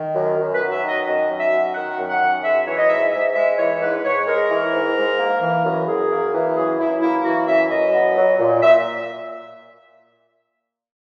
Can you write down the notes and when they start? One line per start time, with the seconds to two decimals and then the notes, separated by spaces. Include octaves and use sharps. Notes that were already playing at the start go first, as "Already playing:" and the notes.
Already playing: D#3
0.14 F#2
0.37 F#2
0.54 B4
0.60 F#3
0.71 E5
0.83 D#3
0.88 D#5
1.05 F#2 D#5
1.29 F#2
1.40 E5
1.52 F#3
1.74 D#3 F#5
1.98 F#2
2.09 F#5
2.20 F#2
2.43 G#3 E5
2.66 E3 C#5
2.78 D#5
2.89 G#2 E5
3.12 G#2 E5
3.35 G#3 E5
3.58 E3 C#5
3.81 G#2 B4
4.04 G#2 C#5
4.27 G#3 A#4
4.49 E3
4.73 G#2
4.96 G#2
5.18 A#3
5.41 E3
5.64 F#2
5.87 F#2 G#4
6.10 A#3
6.33 E3
6.56 F#2 G#4
6.78 F#2 E4
7.02 A#3 E4
7.25 E3 F#4
7.47 F#2 E5
7.70 F#2 D#5
7.93 B3
8.16 F#3
8.39 A#2
8.62 A#2 E5